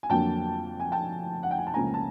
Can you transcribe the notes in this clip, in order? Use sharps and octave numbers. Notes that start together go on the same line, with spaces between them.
G#5
F2 D3 F#3 A#3 G5 A5
G#5
G5 A5
F#5
G5
G#5
A5
C#2 C#3 F3 A#3 G#5 A#5
A5